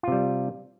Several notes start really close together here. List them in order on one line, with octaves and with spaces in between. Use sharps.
F4 C3 G3